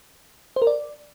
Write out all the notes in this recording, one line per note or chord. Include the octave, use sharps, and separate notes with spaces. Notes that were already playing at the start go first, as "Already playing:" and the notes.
C5
A#4
D5